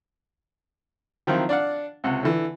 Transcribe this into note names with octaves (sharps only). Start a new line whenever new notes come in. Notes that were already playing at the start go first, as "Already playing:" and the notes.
D#3 F3 F#3 C4 E4 F4
D4 D5 F5 F#5
C#2 C3 F#5
D3 E3